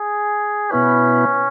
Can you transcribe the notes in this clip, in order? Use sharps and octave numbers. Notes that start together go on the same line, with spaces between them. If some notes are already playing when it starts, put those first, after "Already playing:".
Already playing: G#4
B2 B3 C#4 E4 B4